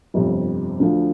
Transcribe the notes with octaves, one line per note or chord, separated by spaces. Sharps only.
G1 F2 C3
D2 D3 F3